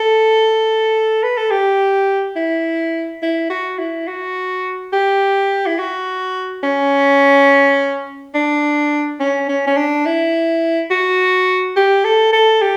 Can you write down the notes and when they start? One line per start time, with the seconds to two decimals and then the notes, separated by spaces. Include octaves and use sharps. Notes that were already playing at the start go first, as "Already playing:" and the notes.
Already playing: A4
1.23 B4
1.37 A4
1.51 G4
2.36 E4
3.22 E4
3.50 F#4
3.79 E4
4.07 F#4
4.93 G4
5.67 E4
5.79 F#4
6.63 C#4
8.34 D4
9.20 C#4
9.49 C#4
9.67 C#4
9.77 D4
10.06 E4
10.91 F#4
11.76 G4
12.05 A4
12.33 A4
12.62 G4